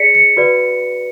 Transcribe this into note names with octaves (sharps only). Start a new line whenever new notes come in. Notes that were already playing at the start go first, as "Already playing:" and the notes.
Already playing: G#4 D5 B6 C#7
C#7
F#4 B4 D5